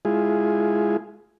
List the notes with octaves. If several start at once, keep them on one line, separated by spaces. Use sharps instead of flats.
G#3 E4 F4 G#4